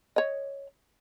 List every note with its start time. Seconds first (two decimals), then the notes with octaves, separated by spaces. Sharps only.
0.16 C#5 D#5